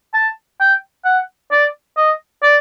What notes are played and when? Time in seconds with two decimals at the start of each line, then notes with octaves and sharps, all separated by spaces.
0.14 A5
0.60 G5
1.05 F#5
1.51 D5
1.97 D#5
2.43 D5